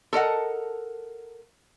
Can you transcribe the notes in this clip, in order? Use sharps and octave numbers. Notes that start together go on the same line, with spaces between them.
A4 A#4 D#5 F#5